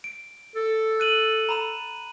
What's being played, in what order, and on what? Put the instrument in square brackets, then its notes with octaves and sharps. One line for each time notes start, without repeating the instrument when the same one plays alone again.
[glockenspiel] D7
[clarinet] A4
[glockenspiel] F#6 D#7 F#7
A#5 B5 E7